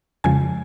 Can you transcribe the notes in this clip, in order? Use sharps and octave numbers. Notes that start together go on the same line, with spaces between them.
F2 C#3 F3 G#3 G#5